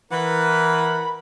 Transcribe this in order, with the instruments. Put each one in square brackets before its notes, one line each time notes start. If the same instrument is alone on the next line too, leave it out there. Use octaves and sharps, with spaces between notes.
[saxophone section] E3 [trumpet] A#4 [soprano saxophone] F#5 [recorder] B5